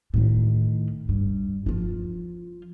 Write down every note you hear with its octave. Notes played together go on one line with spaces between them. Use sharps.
A2 D#3
G2
F3 F4